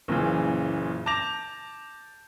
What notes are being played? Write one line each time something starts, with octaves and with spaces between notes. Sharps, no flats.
F#1 A#2 C#3 E3
A5 D6 G6 A#6 F7